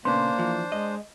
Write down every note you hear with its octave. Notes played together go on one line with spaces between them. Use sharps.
A#2 C#3 A#3 B3 D4 C5 C6
E3 F3
G#3 D#5